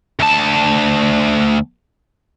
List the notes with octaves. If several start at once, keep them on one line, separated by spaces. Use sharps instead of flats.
D2 A5